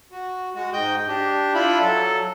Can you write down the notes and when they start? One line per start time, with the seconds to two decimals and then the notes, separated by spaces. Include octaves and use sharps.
0.12 F#4
0.55 G#3 F#4
0.73 G#2 D#5 G5 G6
1.08 D4 G4
1.54 D4 E4 F4 B5
1.81 F#3 A4